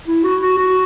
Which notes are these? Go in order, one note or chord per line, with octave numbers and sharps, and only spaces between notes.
E4
F#4
F#4
F#4